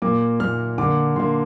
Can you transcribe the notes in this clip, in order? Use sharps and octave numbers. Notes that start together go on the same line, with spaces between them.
A#2 A#3 D6
A#2 A#3 F6
D3 A#3 D6
D3 A#3 C6